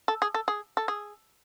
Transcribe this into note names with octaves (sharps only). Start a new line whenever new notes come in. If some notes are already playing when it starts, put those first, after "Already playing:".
A4
G#4
A4
G#4
A4
G#4